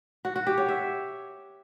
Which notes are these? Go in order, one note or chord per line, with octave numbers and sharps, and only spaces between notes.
F#4
F#4
G4
C#5
E5